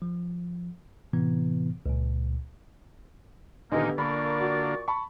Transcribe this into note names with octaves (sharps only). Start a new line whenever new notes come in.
F3
A2 C3 E3 B3
C#2 A#2
A#2 D3 D#3 G#3 A#3 B3 D#4 G4
A#2 D3 A#3 D5 B5 C#6
F#4
A5 B5 C#6